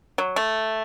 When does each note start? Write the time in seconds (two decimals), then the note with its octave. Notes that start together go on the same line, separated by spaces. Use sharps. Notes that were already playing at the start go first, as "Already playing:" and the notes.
0.18 F#3
0.36 A3